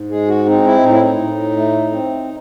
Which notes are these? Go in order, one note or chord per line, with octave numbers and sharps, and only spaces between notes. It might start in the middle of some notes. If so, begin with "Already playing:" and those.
Already playing: G#2
G#3 G#4
F#4
C4 D#4
E4
A2 D#4
E4
D#4
A2
A3
C4